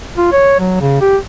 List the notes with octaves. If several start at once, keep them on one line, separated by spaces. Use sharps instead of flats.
F4
C#5
F#3
C#3
G4